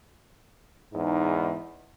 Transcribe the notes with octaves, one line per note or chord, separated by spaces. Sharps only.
E2 G#2 D#4